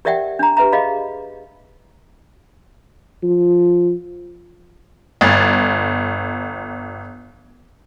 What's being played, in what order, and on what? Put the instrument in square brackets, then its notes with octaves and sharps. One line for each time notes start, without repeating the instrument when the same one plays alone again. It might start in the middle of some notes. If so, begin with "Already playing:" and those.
[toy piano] G4 A#4 D5 E5 F#5 G5
D4 A#5
G4 B4 E5 A#5
G#4 D#5 F5 B5
[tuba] F3
[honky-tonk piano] G1 A6